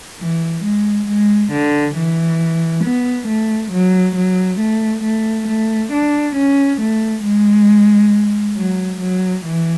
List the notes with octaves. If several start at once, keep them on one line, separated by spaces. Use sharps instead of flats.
E3
G#3
G#3
D3
E3
B3
A3
F#3
F#3
A3
A3
A3
D4
C#4
A3
G#3
F#3
F#3
E3